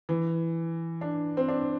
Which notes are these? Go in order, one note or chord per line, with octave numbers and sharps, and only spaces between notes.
E3
D4
C4
D4